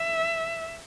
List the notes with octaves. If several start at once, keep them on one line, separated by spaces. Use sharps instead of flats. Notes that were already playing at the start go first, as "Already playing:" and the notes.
Already playing: E5